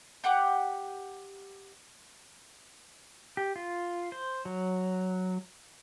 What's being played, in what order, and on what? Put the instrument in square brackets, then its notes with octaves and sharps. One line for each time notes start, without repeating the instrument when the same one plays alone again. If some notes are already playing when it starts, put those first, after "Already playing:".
[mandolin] G4 F#5 G5 D6
[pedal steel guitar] G4
F4
C5
F#3